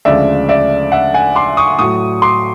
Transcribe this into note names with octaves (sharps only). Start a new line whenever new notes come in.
D2 C#3 F3 G#3 D5 E5
D5 E5
E5 F#5
F#5 G#5
C6 D6
C#6 D#6
A2 F#3 C#6 D#6
C6 D6